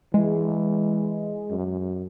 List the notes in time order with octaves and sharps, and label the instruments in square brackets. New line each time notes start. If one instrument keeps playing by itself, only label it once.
[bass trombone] E3 [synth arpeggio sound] G#3
[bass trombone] F#2